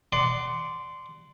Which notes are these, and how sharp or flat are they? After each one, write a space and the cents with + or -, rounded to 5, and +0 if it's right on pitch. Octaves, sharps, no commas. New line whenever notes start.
D5 +0 F#5 +25 C6 -15